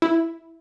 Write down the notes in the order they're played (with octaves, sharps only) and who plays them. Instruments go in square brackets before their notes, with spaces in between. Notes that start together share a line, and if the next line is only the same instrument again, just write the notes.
[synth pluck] E4